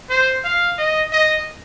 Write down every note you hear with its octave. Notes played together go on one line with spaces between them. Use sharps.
C5
F5
D#5
D#5